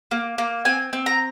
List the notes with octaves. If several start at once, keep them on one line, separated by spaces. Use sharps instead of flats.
A#3
A#3
C4 G#5
C4
A#5